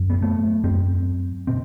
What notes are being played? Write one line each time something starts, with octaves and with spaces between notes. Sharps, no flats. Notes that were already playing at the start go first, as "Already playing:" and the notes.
Already playing: F#2
B3
A3
F#2 C4
B2 C4